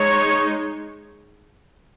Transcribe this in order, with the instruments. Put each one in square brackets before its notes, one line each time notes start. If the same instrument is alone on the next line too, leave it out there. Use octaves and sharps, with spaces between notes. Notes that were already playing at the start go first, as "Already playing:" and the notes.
Already playing: [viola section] G#3 D#4 C#5